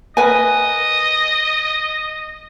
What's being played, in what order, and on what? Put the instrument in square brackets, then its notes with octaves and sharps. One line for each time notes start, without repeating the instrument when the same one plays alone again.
[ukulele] A#4 B4 G#5 [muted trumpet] D#5